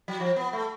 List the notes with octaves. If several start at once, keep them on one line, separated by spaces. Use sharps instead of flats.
F#3
F3
B3
A3